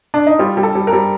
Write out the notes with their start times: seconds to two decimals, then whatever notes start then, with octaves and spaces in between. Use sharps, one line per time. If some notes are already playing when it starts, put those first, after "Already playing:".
0.14 D4
0.27 D#4
0.39 G3 F4
0.57 G3
0.63 A4
0.75 G3
0.87 A#4
0.93 G3